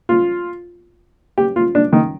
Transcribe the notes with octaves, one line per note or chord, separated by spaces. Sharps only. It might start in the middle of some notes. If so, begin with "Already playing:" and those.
F4
G4
F4
D4
D#3